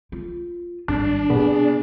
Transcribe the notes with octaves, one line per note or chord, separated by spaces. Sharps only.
F4
G#1 G2 D4
C3 B3 G#4